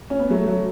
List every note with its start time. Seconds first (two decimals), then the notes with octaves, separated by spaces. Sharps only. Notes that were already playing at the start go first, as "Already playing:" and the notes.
0.10 C#4
0.19 B3
0.30 F#3 A3
0.47 F#3 A3